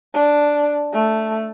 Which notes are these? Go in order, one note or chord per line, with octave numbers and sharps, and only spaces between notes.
D4
A3